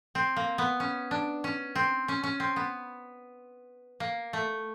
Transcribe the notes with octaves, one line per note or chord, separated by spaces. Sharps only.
C4
A#3
B3
C#4
D4
C#4
C4
C#4
C#4
C4
B3
A#3
A3